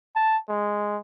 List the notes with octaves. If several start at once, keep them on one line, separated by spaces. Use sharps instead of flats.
A5
G#3